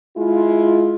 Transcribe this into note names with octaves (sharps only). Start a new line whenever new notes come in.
G#3 E4 F4